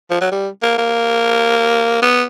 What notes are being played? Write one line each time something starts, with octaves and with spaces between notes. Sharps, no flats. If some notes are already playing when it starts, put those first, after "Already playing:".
F3
F#3
G3
A#3
A#3
B3